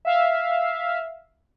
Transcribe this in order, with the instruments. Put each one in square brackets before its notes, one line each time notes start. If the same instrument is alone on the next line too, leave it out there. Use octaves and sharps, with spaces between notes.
[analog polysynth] E5 F5